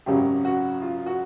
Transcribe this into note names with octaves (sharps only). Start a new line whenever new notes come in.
G#1 F#2 C#3 F#3 G4
F#4
F4
F#4